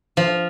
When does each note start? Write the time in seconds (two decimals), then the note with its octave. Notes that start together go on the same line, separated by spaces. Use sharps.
0.17 F3